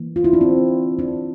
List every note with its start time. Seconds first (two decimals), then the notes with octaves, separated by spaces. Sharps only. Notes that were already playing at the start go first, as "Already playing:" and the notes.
Already playing: E3 A#3
0.16 F4
0.24 E4
0.33 D4
0.41 C4
0.99 D4